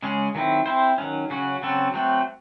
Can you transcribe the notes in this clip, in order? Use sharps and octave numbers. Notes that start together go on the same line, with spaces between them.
C#3 G#3 C#4 G#4
D#3 F#3 C4 E4
C4 E4 C5
D#3 F#3 C#4
C#3 F#3 C#4 F#4
C#3 F#3 C4 F#4 A4
F#3 A3 C4 F#4